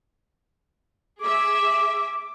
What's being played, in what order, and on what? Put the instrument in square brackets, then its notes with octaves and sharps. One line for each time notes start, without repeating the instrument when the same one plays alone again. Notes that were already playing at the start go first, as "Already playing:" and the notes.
[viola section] G#4 E5 [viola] D6